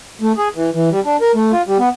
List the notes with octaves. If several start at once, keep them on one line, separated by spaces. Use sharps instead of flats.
A3
G#4
E3
E3
G3
D4
A#4
A3
F4
G3
B3